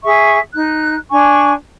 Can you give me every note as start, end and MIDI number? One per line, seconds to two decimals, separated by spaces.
0.04 0.38 68
0.04 0.38 76
0.04 0.38 85
0.53 0.95 63
0.53 0.95 90
1.11 1.52 62
1.11 1.52 80
1.11 1.52 85